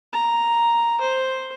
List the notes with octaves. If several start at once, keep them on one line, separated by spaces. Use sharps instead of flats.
A#5
C5